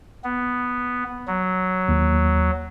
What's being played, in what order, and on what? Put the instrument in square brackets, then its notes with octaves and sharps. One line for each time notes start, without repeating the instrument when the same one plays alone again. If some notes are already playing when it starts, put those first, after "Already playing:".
[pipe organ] B3
F#3
[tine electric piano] D#2